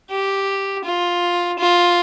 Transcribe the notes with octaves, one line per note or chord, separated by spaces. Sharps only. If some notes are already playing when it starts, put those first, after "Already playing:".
G4
F4
F4